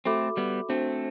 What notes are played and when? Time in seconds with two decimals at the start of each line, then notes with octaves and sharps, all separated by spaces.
0.06 A3 C4 F#4 A4 E5 B5 D6
0.37 G3 B3
0.69 A3 C4 D4 F#4 C5